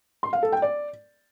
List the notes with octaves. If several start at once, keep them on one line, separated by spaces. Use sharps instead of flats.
C6
F5
A4
G5
D5